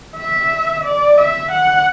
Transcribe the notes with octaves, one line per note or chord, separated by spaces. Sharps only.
E5
D5
E5
F#5